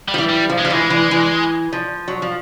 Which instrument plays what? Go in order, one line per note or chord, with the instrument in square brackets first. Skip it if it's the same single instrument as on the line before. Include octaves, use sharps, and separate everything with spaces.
[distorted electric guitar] G3
[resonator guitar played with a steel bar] F3
E3
[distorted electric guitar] G3
[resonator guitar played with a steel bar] F3
[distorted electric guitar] G#3
[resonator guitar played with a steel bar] F3 [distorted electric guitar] G3
[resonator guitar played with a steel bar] E3 [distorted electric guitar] G#3
[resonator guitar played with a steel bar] E3
E3
F3
F#3
F3